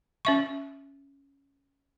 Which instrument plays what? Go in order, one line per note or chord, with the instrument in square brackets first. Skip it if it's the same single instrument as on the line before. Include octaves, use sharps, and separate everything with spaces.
[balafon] C#4 E5 C#6